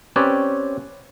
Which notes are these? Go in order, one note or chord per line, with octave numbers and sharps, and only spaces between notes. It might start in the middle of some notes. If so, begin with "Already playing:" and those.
C4 C#4 G4 B4 C#5 D5